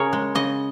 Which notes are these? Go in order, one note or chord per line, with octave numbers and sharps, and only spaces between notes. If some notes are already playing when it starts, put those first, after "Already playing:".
Already playing: C#3 G#4 A#4 C#5
G#3
C#3 D#5